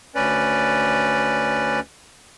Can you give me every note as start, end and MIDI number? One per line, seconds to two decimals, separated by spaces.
0.15 1.80 38
0.15 1.80 61
0.15 1.80 71
0.15 1.80 74